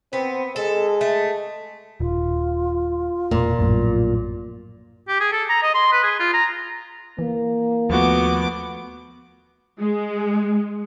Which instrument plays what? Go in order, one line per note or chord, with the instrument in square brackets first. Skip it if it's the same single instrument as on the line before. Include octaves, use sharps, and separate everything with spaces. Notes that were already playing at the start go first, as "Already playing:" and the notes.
[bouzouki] B3 [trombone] C4
[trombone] G#3 [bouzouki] A4
[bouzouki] A3
[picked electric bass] D#1 [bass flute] F4
[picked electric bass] E1 [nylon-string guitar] A#2
[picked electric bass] A#1 F#2 A2
[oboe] G4
G#4
A4
A#5
D#5
C6
B4
G#4
F4
A#5
[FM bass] E3 [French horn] A#3
[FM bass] D#2 [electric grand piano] F3 A3 F#4 [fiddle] B3 D6
[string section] G#3